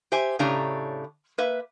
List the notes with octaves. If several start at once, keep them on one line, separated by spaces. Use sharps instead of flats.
G4 C5 E5 G#5
A2 C#3 A3 D4 G4 A#5
A#3 B4 E5